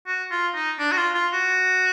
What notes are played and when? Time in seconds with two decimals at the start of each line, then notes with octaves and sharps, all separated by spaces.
0.07 F#4
0.31 F4
0.54 D#4
0.79 D4
0.92 F#4
0.97 F4
1.15 F4
1.33 F#4